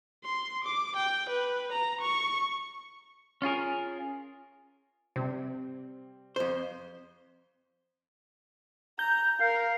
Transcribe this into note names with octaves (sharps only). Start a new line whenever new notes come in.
C6
D6
G5
B4
A#5
C#6
C#4 F4 G#4 A#4
C3 G3 C4
F2 C5
A#5 G6
A#4 F5